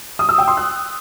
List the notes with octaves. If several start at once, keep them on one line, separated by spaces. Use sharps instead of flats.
D#6
E6
G5
C6
F#6